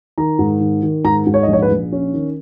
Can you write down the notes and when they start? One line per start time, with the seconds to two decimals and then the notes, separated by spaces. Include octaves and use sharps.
0.18 D#3 A#5
0.39 G#2
0.61 D#3
0.83 D#3
1.04 G#2 A#5
1.27 G#2
1.34 C#5
1.43 D#5
1.48 A#1
1.53 C#5
1.62 B4
1.71 A#1
1.92 C#4
2.13 D#3